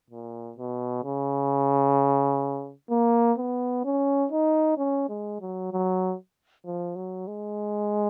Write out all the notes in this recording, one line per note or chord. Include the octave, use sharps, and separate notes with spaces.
A#2
B2
C#3
A#3
B3
C#4
D#4
C#4
G#3
F#3
F#3
F3
F#3
G#3